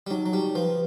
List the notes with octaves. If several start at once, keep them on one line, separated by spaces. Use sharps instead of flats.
G3
F#3 D#4
F#3
G3 G4
F3 B4